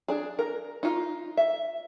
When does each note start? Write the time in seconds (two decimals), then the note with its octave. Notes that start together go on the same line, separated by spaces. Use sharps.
0.08 D4 G#4
0.39 A#4
0.83 D#4 F4
1.37 E5